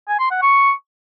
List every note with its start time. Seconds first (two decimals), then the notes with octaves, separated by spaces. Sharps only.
0.08 G#5
0.19 C6
0.31 F#5
0.42 C#6